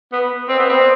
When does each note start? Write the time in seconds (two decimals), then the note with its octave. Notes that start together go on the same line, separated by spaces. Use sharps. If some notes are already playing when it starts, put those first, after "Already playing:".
0.12 B3
0.49 C4
0.59 B3
0.69 C4